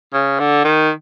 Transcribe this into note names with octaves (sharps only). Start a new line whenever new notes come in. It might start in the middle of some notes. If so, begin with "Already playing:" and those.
C#3
D3
D#3